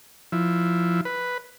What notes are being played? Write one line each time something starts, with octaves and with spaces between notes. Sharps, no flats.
F3 E4
B4